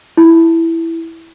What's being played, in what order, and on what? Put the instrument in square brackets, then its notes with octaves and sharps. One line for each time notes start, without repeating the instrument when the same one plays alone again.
[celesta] E4